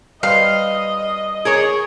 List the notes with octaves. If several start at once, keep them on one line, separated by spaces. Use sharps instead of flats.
G3 B4 C5 D#5 F5
G#4 A#4 C#5